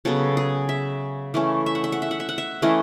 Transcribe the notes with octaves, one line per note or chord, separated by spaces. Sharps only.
C#3 F#3 B3 A4
G#4
E5
E3 A3 C#4
E5
F#5
E5
F#5
E5
F#5
E5
F#5
E5
E3 A3 C#4 D#5